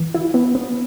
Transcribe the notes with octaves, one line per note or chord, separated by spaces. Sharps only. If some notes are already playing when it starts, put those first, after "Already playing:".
Already playing: E3
E4
B3
B3